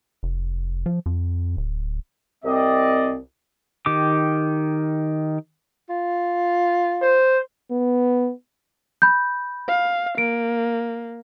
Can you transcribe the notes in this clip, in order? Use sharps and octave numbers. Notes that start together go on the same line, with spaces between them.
F1
F3
F2
D1
C2 C4 D5 D#5
D#3 G4 D6
F4
C5
B3
B5 G6
F5
A#3 D7